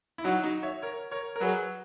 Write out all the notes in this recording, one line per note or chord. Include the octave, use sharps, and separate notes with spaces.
E4
F#3 D#4 F#4
D#4 F#4
C#5 E5
A#4 C#5
A#4 C#5
A#4
F#3 G#4 B4